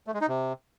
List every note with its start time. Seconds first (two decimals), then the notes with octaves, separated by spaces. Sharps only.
0.07 A3
0.14 G#3
0.21 D#4
0.28 C3